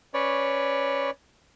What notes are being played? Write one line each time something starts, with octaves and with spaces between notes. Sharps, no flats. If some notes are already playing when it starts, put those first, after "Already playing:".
C#4 B4 C#5 D5